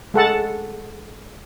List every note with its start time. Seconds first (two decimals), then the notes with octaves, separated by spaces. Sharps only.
0.14 G#3 A4 F#5 A5